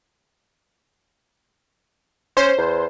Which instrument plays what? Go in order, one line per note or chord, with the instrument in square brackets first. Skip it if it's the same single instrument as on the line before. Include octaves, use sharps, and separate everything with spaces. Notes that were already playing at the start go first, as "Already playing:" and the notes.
[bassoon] C#4 [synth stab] C5
[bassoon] E2